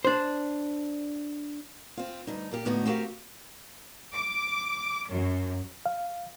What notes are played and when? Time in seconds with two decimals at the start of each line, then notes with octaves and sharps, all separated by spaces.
0.05 D4 C5
1.97 C4 F4
2.27 D2 G2 D#4
2.51 A#2 A#3 G4
2.65 A2 D3 B3 D#4 F#4
2.86 C4 F#4 G4 A#4 F5
4.14 D6
5.09 F#2
5.86 F5